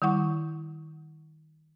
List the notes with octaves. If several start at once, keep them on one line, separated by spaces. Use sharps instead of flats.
D#3 G3 E4 F#5 C#6